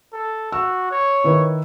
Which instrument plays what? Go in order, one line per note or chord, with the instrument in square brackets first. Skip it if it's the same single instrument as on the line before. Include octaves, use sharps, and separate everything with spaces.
[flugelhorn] A4
[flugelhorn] F#4 [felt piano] E6
[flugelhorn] C#5
[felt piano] D#3 E4 B4